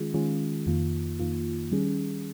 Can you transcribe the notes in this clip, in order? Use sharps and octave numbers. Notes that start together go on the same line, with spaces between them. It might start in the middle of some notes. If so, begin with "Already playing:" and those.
Already playing: D#3 G#3 C#4 F4 G#4
D#3 G#3 C#4 F4 G#4
F2 D#3 A#3 F4
F2 D#3 A#3 F4
D#3 G3 C#4 G#4